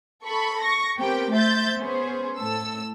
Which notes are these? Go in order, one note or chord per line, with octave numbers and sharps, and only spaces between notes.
A4 B5 C#6
C#6 A#6
B3 C4 G4 A#4 G5
A3 C5 E5 G6 A6
B3 C#4 G#4 C5
A2 A4 E6